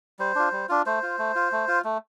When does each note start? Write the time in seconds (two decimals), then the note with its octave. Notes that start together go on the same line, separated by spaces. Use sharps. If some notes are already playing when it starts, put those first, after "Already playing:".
0.19 G3 C5
0.35 D4 F4
0.52 G3
0.69 D4 F4
0.86 A3 C5
1.03 F4
1.19 A3
1.35 F4
1.52 A3
1.68 F4
1.84 A3